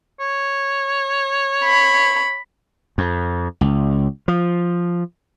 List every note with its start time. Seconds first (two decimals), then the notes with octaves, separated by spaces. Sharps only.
0.20 C#5
1.65 B5
2.98 F2
3.61 C#2
4.28 F3